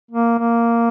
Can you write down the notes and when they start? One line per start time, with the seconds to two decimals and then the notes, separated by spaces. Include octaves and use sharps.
0.11 A#3
0.39 A#3